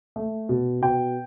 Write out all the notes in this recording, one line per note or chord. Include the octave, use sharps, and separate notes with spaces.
A3
B2
B2 G5